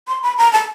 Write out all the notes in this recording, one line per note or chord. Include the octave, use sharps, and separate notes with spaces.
C6
B5
A#5
A5